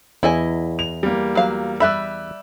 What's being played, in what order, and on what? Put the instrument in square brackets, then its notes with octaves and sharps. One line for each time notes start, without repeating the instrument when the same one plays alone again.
[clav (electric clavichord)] E2 [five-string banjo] E4 D#5 G#5
[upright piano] F7
G3 A#3
[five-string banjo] F#3 F5
[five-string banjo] G3 E5 B5 [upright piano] E6 F#6